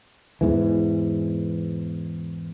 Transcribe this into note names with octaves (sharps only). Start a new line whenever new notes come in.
E2 G#2 E3